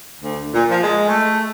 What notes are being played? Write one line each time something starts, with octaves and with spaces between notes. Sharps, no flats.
D2
A#2
F3
G#3
A3